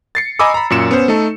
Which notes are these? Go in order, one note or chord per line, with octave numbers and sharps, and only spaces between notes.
A6 C7 C#7
D#5 G#5 A#5 B5 D6 E6
A#5 B5
F#2 A#2 C#7 E7
B3 C#4 C5
A3 D#4 A4